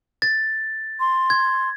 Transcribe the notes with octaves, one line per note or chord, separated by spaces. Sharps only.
A6
C6
G#6